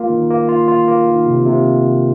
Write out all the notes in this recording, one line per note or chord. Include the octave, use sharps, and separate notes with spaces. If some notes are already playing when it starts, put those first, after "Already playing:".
Already playing: A#3 F4
D#3
A#3
F4
F4
A#3
D#3
C3
C3